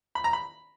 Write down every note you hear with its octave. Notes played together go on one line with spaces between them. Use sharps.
B5
A#5
B5